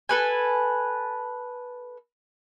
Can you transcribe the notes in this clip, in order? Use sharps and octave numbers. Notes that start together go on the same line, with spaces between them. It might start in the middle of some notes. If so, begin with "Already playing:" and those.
A4 B4 G#5